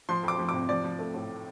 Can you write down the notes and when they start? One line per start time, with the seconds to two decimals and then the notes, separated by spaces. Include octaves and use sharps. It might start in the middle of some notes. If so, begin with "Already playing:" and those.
0.09 F3 C6
0.23 F2 D6
0.39 F3
0.49 C3 D6
0.69 F3 D5
0.84 F3
0.99 A3
1.14 A2